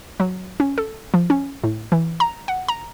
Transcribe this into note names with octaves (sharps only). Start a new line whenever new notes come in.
F#3
C#4
A4
F3
C#4
A2
E3
A#5
F#5
A#5